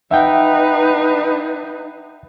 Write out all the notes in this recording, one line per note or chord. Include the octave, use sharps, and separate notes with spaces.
D#4 B4 E5 F#5 G5